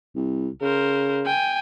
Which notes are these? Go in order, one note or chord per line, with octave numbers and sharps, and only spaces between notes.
C2
C#3 A#4 C5
G5 G#5